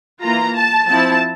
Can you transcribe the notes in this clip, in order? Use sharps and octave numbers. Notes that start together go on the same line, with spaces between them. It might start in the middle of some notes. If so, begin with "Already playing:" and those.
E3 A#3 F4 A#5
A5
F3 C4 E4 A5